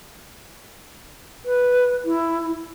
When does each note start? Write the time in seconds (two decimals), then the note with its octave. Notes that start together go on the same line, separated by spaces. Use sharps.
1.45 B4
2.05 E4